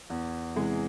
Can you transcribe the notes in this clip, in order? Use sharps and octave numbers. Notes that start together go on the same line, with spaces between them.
E2
C3 E3 G#3